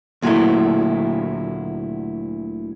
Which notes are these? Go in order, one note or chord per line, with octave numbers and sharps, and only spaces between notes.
D2 A#2 F#3 G#3 A3 E4